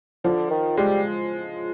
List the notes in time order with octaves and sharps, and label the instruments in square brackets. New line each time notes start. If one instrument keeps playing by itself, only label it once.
[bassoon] D3 [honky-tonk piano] F3
[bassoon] D#3
[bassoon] G3 [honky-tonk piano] G#3